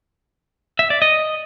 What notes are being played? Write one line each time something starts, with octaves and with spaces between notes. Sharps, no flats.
E5
D5
D#5